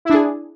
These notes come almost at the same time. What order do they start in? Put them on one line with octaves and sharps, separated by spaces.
E4 D4 G#4